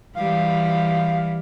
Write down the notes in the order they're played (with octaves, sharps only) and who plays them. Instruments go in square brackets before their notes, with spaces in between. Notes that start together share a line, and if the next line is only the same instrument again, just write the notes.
[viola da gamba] E3 G3 [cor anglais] F5